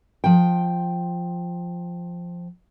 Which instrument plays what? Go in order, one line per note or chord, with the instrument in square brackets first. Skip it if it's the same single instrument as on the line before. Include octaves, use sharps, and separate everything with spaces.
[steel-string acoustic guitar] F3 G5